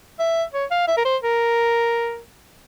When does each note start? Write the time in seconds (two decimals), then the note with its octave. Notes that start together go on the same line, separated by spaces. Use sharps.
0.19 E5
0.53 C#5
0.70 F5
0.87 E5
0.97 A#4
1.04 C5
1.23 A#4